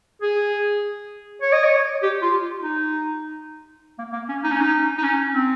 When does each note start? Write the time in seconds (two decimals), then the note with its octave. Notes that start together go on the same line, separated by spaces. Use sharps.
0.22 G#4
1.42 C#5
1.53 D#5
1.64 C#5
2.03 G4
2.22 F4
2.62 D#4
3.98 A#3
4.13 A#3
4.29 C#4
4.44 D#4
4.52 C#4
4.61 D#4
4.97 D#4
5.04 C#4
5.34 C4